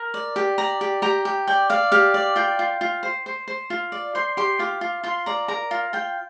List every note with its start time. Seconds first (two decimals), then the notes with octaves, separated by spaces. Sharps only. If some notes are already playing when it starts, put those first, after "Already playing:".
Already playing: A#4
0.14 D5
0.36 G4
0.58 D5 A#5
0.81 G4
1.02 G4 A#5
1.25 G4
1.47 D5 G5
1.70 D5 F5
1.92 G4 F5
2.14 D5
2.36 F4 G5
2.59 F4
2.81 F4
3.03 C5
3.26 C5
3.48 C5
3.70 F4
3.92 D5
4.15 C5 C6
4.37 G4 C6
4.59 F4 D6
4.81 F4
5.03 F4 C6
5.26 D5 A#5
5.48 A#4 A#5
5.71 F4
5.93 F4 G5